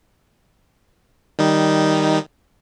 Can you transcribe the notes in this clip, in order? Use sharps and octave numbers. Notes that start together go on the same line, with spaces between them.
D#3 G3 D#4